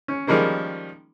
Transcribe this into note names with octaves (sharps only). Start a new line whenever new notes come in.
C#4
D#3 F3 G3 G#3 A#3 C#4